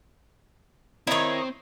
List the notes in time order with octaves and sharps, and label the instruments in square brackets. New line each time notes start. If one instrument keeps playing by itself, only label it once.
[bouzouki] D#3 D#4 [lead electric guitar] C4 [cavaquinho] E4 C#5